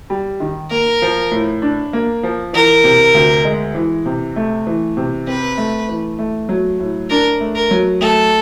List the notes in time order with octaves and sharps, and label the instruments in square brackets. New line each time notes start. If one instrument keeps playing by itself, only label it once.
[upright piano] G3
D#3
[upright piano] A#3 [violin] A#4
[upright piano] F3
A2
D4
A#3
F3
[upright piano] E3 [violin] A#4
[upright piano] C3
D2
G#3
E3
C3
A3
E3
C3
[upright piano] C4 [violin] B4
[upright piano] A3
E3
A3
F#3
A2
[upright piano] D4 [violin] A#4
[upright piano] A3
[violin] A#4
[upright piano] F#3
[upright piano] A3 [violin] A4